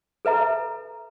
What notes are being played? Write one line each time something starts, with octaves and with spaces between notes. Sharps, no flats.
A4 B4 E5 A#5